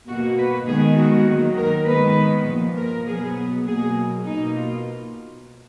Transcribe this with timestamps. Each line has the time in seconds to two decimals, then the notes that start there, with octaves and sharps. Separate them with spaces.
0.08 B2 A#3 F#4
0.38 B4
0.68 D#3 G#3 B3 G#4
0.98 F#4
1.27 D#3 F#3 A#3
1.57 A#4
1.87 D#3 G#3 B3 B4
2.47 A#2 F3 A#3
2.77 A#4
3.06 B2 F#3 B3 G#4
3.66 B2 F#3 A#3 G#4
4.26 B2 A#3 D#4
4.56 F4